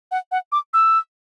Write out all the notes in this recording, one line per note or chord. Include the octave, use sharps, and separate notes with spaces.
F#5
F#5
D6
E6